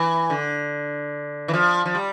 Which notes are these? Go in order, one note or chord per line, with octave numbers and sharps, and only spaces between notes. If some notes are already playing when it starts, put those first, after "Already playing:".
Already playing: E3
D3
E3
F3
F3
G3